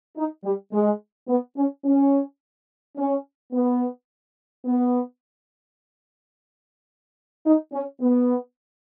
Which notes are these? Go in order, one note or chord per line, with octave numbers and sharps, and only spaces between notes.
D#4
G3
G#3
B3
C#4
C#4
C#4
B3
B3
D#4
C#4
B3